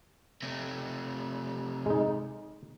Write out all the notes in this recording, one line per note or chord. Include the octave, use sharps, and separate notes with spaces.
C3 A3
G#3 D#4